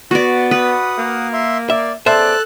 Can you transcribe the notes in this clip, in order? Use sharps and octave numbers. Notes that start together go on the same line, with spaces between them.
B3 F#4 D5
B4 F#5 D#6
A#3
E5 C6
D5 E5
C#3 B3 A4 C5 D5 E5 A5 F#6